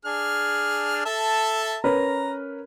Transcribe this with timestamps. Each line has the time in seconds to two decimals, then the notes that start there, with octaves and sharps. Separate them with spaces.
0.05 D4 G#4 F6
1.05 A4 E5 A5
1.84 C#4 A#4 B4 A#5